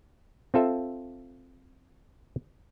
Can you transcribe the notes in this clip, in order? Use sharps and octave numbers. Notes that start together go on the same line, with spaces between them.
C4 F4 A4 E5